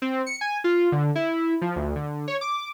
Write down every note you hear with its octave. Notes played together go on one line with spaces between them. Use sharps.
C4
C#7
G#5
F4
D3
E4
F3
D2
D3
C#5
D6